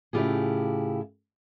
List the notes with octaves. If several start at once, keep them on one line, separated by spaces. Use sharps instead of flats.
A2 C#3 E4 F4 G4 G#4